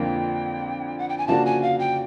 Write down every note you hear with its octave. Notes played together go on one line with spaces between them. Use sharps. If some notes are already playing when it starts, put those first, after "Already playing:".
Already playing: F2 D3 F3 A#3 G5
F#5
G5
G#5
C#3 F3 A#3 D4 F#4 A5
G#5
F5
G5